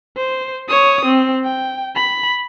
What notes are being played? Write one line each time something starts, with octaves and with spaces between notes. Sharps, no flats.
C5
C#5 D#6
C4
G5
B5